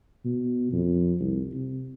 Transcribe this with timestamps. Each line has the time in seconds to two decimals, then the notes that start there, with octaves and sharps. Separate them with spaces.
0.25 B2
0.73 F2
1.20 C2
1.54 C3